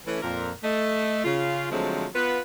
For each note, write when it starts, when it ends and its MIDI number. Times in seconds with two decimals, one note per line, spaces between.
0.06 0.19 52
0.06 0.19 57
0.06 0.19 61
0.22 0.51 41
0.22 0.51 46
0.22 0.51 70
0.63 1.24 57
0.63 1.24 75
1.25 1.69 49
1.25 1.69 65
1.71 2.06 50
1.71 2.06 53
1.71 2.06 54
1.71 2.06 56
1.71 2.06 57
1.71 2.06 60
2.15 2.40 59
2.15 2.40 65
2.15 2.40 71